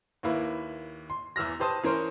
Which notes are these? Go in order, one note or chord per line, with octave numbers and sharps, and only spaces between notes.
D#2 A#3 E4 B4
C6
E2 E3 E6 F6 A#6
G4 B4 C5 A5 D#6
E3 C#4 A#4 C5